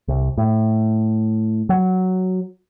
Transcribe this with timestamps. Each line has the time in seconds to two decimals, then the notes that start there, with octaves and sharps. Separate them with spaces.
0.08 C2
0.38 A2
1.69 F#3